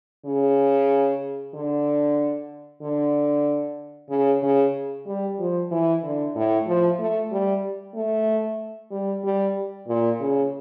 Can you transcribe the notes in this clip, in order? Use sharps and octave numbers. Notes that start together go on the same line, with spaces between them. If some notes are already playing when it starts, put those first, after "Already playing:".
C#3
D3
D3
C#3
C#3
G3
F3
E3
D3
A2
F3
A3
G3
A3
G3
G3
A#2
C#3